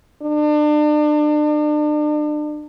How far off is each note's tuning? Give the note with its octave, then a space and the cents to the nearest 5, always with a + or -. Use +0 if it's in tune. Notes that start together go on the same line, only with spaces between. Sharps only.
D4 +35